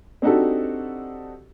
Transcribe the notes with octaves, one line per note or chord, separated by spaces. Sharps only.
C4 D4 D#4 F#4 G4 A4